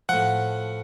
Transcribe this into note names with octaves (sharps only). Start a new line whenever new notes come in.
A2 F3 F#5